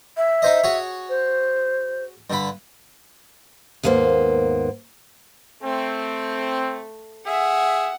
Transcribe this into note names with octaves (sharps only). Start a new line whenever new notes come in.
E5
D#4 C5 D#5
F#4 G#4 C#5
C5
G2 D3 B5
D#2 G#2 A#3 B3 C5
A3 C4
G#4 E5 F#5